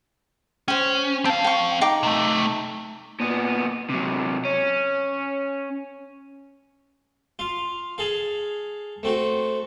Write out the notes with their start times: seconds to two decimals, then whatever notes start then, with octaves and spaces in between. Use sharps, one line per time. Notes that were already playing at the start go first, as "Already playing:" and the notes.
0.68 C#4 C5 G5
1.25 C4 F5 A5
1.44 G5 C#6
1.81 D#4 G5 D6
2.03 C3 A3
3.20 A#2 B3
3.90 C3 F#3
4.45 C#4
7.39 F4 F5
7.98 G#4 A4 F5
9.03 A3 C4 F#4